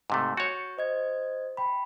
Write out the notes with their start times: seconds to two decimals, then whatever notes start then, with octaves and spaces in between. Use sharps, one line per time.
0.10 G#2 C3 A3
0.37 F#4 C#5 C#6 G6 A6
0.78 C5 D#5 G#6
1.57 G5 B5